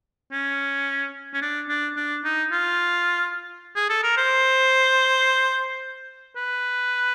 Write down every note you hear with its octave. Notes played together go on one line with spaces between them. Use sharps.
C#4
C#4
D4
D4
D4
D#4
F4
G#4
A4
A#4
C5
B4